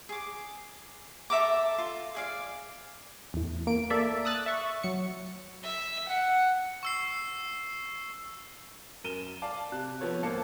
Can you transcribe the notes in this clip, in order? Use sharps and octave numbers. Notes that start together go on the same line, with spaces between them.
G#4 D6
A4 E5 A#5 D6
F4
G#4 D5 F5
E2 A2
A#3 D7
A#3 A4 D5 E5
D#6 E6 F#6 A6
E5 C#6
F#3 C#7
E5
F#5
C#6 E6 C7
F#2 A#4 D#7 E7 G7
D5 F5 A5 D6
C3 F#6
F3 B3 A4 C#5
D#1 G#1 A#3 C5 A5 C#7